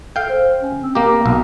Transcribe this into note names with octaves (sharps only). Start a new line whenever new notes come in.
A4 F5 G5
C5
C#4
C4
A#3 G4 A#5
B1